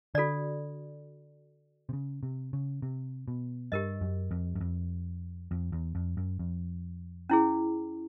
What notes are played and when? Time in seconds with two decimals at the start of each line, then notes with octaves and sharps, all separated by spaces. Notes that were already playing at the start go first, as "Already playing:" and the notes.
0.14 D3 F#4 A4 D5
1.89 C3
1.93 C#3
2.23 C3
2.53 C#3
2.82 C3
3.28 B2
3.72 G2 G4 A#4 D#5
4.01 F#2
4.31 F2
4.56 F#2
4.61 F2
5.51 F2
5.72 E2
5.95 F2
6.17 F#2
6.39 F2
7.30 C#4 E4 G#4